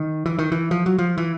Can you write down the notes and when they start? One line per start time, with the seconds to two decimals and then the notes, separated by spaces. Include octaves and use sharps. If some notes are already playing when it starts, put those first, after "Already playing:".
Already playing: D#3
0.26 E3
0.39 D#3
0.52 E3
0.71 F3
0.86 F#3
0.98 F3
1.18 E3